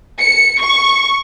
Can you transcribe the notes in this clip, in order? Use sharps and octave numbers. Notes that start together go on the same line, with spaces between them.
C#7
C#6